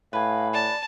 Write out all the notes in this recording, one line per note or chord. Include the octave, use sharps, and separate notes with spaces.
A2 B4 F5 G#5
D5 A5